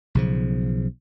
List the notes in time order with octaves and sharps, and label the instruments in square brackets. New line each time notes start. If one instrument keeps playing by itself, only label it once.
[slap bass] B1 C#3 F3